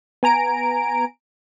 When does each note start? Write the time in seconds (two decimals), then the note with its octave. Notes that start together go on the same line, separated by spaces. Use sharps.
0.23 B3 G#5 A#5 D7